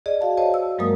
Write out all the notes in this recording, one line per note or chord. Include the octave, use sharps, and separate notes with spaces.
G#4 D5 D#5
F#4 F5 A5
C5 C#5 D#5 A5
E6
G2 F#3 G#3 A#3 A#4 D#6